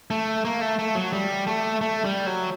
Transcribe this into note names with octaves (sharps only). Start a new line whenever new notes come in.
A3
A#3
A3
A3
F#3
G3
A3
A3
G3
F#3